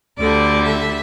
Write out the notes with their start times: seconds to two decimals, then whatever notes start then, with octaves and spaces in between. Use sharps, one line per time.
0.18 D2 D3 G3 D5
0.65 E5